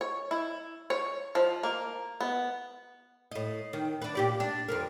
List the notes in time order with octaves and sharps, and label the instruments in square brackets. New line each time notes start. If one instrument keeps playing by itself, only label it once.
[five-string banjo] C#5
E4
C#5
F3
A#3
B3
[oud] A2 D#5
D#3
D4 B4
A#2 G4 D5
D4
F2 D3 A#4